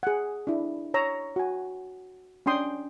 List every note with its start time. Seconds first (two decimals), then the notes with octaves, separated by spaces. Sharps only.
0.03 G#4 F#5
0.47 D4 E4
0.94 C#5 A#5 E6
1.36 F#4 G#5
2.46 C#4 D4 G5 C6 D#6